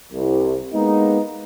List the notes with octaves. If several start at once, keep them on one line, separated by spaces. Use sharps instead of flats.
C2
G#3 A#3 B3 D#4